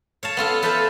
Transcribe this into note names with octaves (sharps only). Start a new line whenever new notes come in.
C#5 F5 A5
B3 F4 A4 F5
A4 B4 C5 E5 F5 A5